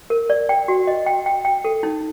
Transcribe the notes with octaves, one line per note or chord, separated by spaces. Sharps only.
A#4
D5
G5
F#4
D#5
G5
G5
G5
A4
D#4